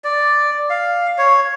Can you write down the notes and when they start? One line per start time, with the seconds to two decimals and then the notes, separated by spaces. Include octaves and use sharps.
0.04 D5
0.70 F5
1.18 C#5